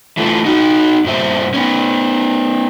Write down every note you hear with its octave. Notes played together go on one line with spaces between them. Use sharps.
E3 A3 F4
D#4 F#4
G2 A#2 C5 E5
B3 C#4